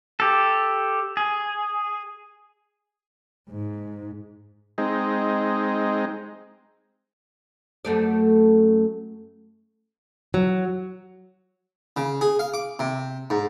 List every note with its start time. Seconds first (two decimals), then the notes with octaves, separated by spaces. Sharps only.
0.20 G4 A4
1.17 G#4
3.50 G#2
4.78 G#3 C4 D#4
7.85 F#2 A3 D5
10.34 F#3
11.97 C#3
12.21 G#4
12.39 F5
12.54 D6
12.79 C3
13.30 G#2